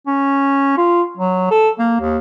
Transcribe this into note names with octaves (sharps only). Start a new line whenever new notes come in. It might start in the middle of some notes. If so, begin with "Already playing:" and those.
C#4
F4
F#3
A4
A#3
D#2